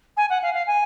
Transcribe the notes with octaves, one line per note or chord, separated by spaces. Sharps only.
G#5
F#5
F5
F5
G#5